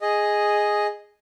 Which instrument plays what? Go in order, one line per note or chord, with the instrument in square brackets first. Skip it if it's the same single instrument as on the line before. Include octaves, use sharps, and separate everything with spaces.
[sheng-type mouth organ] G#4 D#5